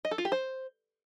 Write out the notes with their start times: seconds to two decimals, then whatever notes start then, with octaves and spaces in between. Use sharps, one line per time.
0.05 D#5
0.11 A4
0.18 F4
0.25 G4
0.32 C5